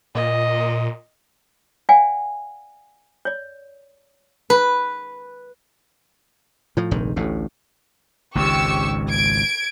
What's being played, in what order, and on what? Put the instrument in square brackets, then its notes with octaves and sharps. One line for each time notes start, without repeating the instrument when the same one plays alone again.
[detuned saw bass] A#2 [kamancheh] D#5
[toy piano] D5 F5 F#5 G#5
C#5 D5
[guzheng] B4
[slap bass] A2 F3
F1 A#1 G#2 D#3
A1 D2 A2
[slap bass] G#1 C#2 G#2 [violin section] G4 C#6 E6
[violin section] G#6 D7